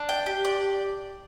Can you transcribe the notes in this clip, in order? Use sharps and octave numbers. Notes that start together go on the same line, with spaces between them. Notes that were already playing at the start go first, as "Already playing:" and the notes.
Already playing: D4
G5
G4
D5